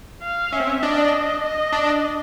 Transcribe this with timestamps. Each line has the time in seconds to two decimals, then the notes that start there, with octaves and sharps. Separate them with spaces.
0.23 F5
0.52 C#4 E5
0.60 C4
0.67 C#4
0.83 D4 D#5
1.43 D#5
1.72 D4